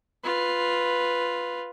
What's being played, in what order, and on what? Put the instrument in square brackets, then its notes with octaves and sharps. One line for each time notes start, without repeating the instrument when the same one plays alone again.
[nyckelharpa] F4 B4